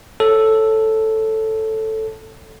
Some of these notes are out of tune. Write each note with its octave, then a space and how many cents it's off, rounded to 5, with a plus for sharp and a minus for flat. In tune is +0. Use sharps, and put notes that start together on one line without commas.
A4 +0 C#5 -10